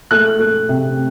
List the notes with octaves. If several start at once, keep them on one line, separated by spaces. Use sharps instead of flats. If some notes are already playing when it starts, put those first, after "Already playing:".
A3 F#6
A3
C3